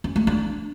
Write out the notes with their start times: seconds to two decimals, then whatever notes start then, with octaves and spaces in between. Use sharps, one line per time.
0.04 C#4
0.16 A3
0.27 D4